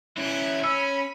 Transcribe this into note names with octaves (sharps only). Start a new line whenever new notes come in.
C#4 E4 F#6 G#6
C#4 B5 E6